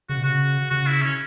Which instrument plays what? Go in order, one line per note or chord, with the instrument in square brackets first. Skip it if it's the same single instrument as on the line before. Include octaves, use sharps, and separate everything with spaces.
[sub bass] C#3 [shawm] F#4
[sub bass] B2
[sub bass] C#3 [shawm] F#4
[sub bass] C#3 [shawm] F#4
[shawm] E4
C#4